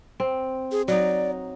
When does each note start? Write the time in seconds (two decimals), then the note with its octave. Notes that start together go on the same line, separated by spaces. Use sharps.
0.20 C4
0.72 G#4
0.88 F#3 D#4 D5